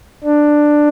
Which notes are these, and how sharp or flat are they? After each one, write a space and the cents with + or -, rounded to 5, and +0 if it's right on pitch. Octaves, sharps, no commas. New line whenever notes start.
D4 +10